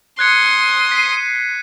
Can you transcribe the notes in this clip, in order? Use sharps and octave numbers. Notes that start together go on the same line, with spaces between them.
C6 D#6 F#6 G#6 C#7
B6 C7 D#7